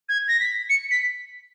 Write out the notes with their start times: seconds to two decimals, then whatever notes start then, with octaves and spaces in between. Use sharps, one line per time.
0.09 G#6
0.28 A#6
0.40 B6
0.70 C#7
0.91 B6